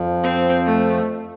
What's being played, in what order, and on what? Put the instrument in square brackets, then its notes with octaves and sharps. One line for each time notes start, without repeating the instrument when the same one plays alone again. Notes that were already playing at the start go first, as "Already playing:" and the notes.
Already playing: [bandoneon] F2 F3
[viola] C4
A3